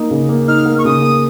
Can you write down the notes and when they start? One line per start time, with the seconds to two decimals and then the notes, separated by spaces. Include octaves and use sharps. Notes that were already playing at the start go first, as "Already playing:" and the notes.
Already playing: A#3 D#4
0.11 C#3
0.29 A#3
0.48 D#4 F6
0.66 A#3
0.78 C#6
0.84 C#3 D#6
1.02 A#3